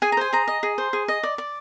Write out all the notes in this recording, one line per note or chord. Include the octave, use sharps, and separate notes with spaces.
G#4 G#5
A#5
C5 G#5
G#4 A#5
D#5
G#4
C5
G#4
D#5
D5
D5